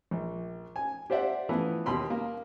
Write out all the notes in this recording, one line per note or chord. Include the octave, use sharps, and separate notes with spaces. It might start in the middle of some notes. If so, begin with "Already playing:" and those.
A#1
G#5
G4 C5 D5 E5 F#5
E3 F3 A3 B3
D#2 B2 B5 C6
A#3